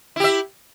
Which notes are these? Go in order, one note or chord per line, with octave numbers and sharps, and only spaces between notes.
E4 G4 E5